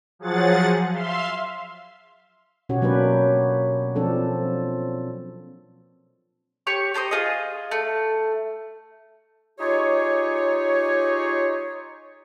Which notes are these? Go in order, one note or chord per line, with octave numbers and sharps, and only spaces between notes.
F3 F#3 G#4 F#5 A6
E5 F5 C6
B2 C#4 F#4 G4 C#5
F#3 A#3 D4 G4 B4
F3 C4 D4 A4
G4 C#5 C#6
G4 A4 C5 D#5
F4 G#4 D#5
A3
D#4 F4 G4 G#4 C#5